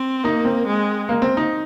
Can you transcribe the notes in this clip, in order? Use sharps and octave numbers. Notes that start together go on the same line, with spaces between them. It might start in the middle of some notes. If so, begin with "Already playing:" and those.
Already playing: C4
A#3 D#4
C4
G#3
A#3
C4
D#4